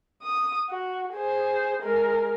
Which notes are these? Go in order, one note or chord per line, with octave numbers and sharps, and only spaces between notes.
D#6
F#4
G#4 C5
G#3 A#4